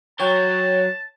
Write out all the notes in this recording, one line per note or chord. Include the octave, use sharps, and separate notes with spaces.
F#3 C#5 G5 A5